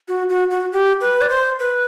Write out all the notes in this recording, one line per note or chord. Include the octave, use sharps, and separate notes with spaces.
F#4
F#4
F#4
G4
B4
D5
C5
B4